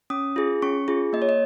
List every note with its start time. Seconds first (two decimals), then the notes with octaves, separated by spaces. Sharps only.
0.10 C#4 D#6
0.36 F4 G#4
0.62 C#4 C#6
0.88 F4 G#4
1.13 A#3 D#5
1.22 C#5
1.29 D#5